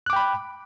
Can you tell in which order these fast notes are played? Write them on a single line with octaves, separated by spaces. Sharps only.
F#6 D6 G5 B5